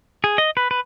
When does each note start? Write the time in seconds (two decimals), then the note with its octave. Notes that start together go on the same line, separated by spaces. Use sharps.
0.24 G#4
0.38 D#5
0.57 B4
0.71 B4